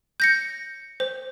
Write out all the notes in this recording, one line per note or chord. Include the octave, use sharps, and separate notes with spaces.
G6 A#6 C#7
C5